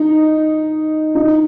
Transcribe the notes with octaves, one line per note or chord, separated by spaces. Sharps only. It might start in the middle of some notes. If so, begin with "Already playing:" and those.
Already playing: D#4
D#4